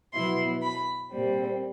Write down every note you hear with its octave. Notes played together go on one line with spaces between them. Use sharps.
B2 F#3 B3 E4 C6
B5
A#2 G3 C4